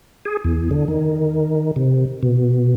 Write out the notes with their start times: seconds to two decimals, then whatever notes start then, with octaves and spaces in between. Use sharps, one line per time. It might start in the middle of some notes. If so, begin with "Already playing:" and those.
0.25 G#4
0.44 E2
0.71 D3
0.88 D#3
1.76 C3
2.23 B2